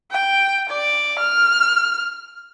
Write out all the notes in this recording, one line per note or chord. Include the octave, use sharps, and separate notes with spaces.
G5
D5
F6